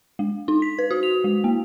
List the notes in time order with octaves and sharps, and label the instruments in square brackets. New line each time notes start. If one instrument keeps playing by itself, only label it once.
[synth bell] G#3
D#4
B6
B4
F#4
F7
G#3
A#3